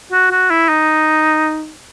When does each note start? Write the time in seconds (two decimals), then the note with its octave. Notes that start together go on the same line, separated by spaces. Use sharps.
0.12 F#4
0.31 F#4
0.50 E4
0.69 D#4